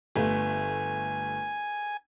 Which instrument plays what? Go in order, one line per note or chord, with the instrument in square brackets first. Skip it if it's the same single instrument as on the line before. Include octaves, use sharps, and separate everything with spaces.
[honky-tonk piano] G1 A3 [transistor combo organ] G#5